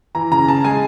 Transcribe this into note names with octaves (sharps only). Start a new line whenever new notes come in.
E3 A#5
C#3 A#5
C#3 A5
G#3 G#5